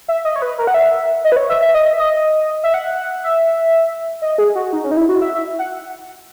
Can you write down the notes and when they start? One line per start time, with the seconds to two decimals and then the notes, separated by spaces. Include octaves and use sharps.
0.08 E5
0.25 D#5
0.36 C#5
0.42 B4
0.58 A#4
0.67 F#5
0.74 E5
1.24 D#5
1.32 B4
1.36 C#5
1.50 E5
1.62 E5
1.74 D#5
1.93 E5
1.99 D#5
2.63 E5
2.74 F#5
3.23 E5
4.22 D#5
4.38 G#4
4.55 F#4
4.73 D#4
4.84 C#4
4.91 D#4
4.97 E4
5.09 F#4
5.21 E5
5.35 E5
5.59 F#5